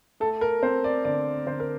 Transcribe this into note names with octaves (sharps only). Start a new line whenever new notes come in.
A3 A4
A#4
C4 C5
D5
D3 D5
D3 C5
A#4